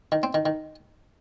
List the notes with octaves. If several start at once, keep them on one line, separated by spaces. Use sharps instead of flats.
D#3
C4
D#3
D#3